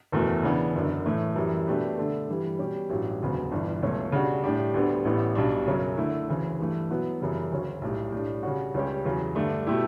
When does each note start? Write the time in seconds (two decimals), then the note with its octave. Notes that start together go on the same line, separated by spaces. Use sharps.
0.12 F#1 E2 B2 A3
0.43 C#3 E3 B3 D4
0.75 F#1 F#2 D3
1.05 A2 E3 A3 E4
1.36 F#2 E3 G3
1.67 B2 A3 D4 G4 B4
1.98 D3 A3 D4 A4
2.28 G2 E3 G3
2.59 B2 G3 C#4 G4
2.89 A1 G2 F#3
3.21 E1 D2 C#3 F#3 B3
3.51 G1 G2 E3 G3 D4
3.82 C#2 B2 F#3 A3 C#4
4.12 C#3 G3 D4 F#4
4.44 A2 G3 D4 G4 D5
4.74 D2 D3 G3 B3
5.05 A1 A2 G3 B3
5.35 B1 B2 G3 D4
5.67 F#2 C#3 F#3 C#4
5.98 D3 A3 E4
6.29 D2 C#3 E3
6.59 G2 E3 A3
6.89 B2 F#3 B3 E4 B4
7.20 F#2 C#3 E3 G3
7.51 D2 C#3 F#3 C#4
7.81 B1 A2 G3
8.12 A2 G3 D4
8.43 C#3 G3 C#4 F#4
8.74 C#2 C#3 G3 C#4 G4
9.04 E2 C#3 F#3
9.35 G2 D3 A3 D4
9.66 B2 A3 E4 G4